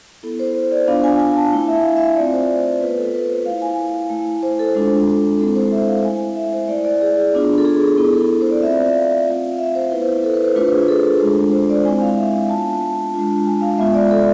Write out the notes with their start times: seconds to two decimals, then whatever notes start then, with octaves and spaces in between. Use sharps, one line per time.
0.23 B3 E4 A4
0.39 C5
0.55 C5
0.71 D5
0.88 B3 D4 F4 F5
1.04 G#5
1.20 G#5
1.37 A5
1.52 A3 E4 G#5
1.68 E5
1.82 F5
1.96 E5
2.16 A3 C4 F4 D5
2.32 C5
2.81 B3 F4 B4
2.98 A4
3.14 B4
3.30 C5
3.46 A3 E4 F5
3.62 G#5
4.10 A3 E4
4.43 C5
4.59 A4
4.75 G#3 D4 F4
5.39 G#3 C4 E4 A4
5.55 C5
5.72 E5
5.88 F5
6.04 A3 E4 G#5
6.36 E5
6.53 C5
6.68 A3 E4 D5
6.85 D5
7.01 G#4
7.33 B3 D4 F4
7.58 A4
7.65 G#4
7.97 B3 E4 A4
8.14 A4
8.41 C5
8.51 D5
8.62 A3 C4 F4 E5
8.73 D5
8.84 E5
8.94 F5
9.27 A3 C4 F4
9.52 F5
9.59 E5
9.75 C5
9.91 B3 E4 B4
10.02 C5
10.24 A4
10.34 B4
10.45 C5
10.56 A3 D4 F4 B4
10.72 G#4
10.88 A4
11.21 G#3 D4 F4
11.52 C5
11.69 D5
11.84 G#3 C4 E4 G#5
12.01 F5
12.17 E5
12.33 F5
12.50 B3 D4 F4 A5
13.14 G#3 D4 F4
13.47 G#5
13.62 F5
13.78 G#3 B3 F4 E5
13.94 D5
14.11 A4